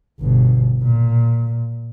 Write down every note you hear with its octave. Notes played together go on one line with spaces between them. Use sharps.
G1 B2
A#2